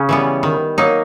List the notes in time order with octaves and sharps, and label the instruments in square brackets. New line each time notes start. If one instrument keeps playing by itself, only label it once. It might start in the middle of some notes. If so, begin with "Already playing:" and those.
Already playing: [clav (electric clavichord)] C#3 C#4
[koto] E3 G3 B3
D#3
F#3 A#3 D#4